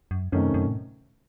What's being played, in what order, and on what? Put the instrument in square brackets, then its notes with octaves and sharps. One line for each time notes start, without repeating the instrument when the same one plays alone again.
[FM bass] F#2
[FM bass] F#2 [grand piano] C3 D#3 A3 C#4
[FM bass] F#2
A2